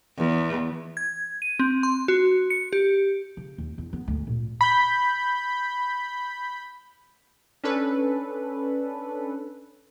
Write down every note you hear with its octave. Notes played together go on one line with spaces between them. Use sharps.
E2
G#6
D#7
C4
C6
F#4
C#7
G4
C#3
D#2
E2
B3
D2
A#2
B5 G6
C#4 D4 A4 B4